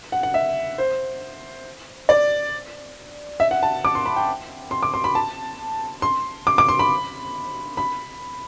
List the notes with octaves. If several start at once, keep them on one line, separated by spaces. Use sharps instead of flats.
F#5
F#5
E5
C5
D5
E5
F#5
A5
D6
C6
B5
G5
C6
D6
C6
B5
A5
C6
D6
D6
C6
B5
B5